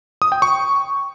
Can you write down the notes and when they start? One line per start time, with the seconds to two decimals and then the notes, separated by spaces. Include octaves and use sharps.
0.22 D#6
0.32 G5
0.42 C#6